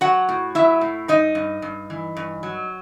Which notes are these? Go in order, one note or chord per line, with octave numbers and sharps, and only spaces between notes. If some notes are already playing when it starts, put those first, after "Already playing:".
F#3 F#4 F#5
A2
F#3 E4 E5
A2
G2 D#4 D#5
G2
G2
E3
G2
F#3